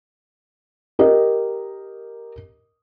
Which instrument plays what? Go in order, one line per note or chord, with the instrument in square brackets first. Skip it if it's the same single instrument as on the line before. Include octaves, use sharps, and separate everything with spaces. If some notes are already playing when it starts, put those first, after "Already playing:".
[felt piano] G4 A#4 D#5